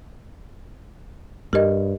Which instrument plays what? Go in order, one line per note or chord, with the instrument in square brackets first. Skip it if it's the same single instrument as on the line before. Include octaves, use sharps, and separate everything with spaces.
[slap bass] G2 [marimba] G4 A#4 D#5